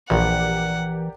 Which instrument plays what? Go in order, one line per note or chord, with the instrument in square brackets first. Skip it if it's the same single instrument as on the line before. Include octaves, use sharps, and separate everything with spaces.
[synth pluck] A#1 [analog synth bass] E3 [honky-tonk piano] G4 A#4 D5 [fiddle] F#5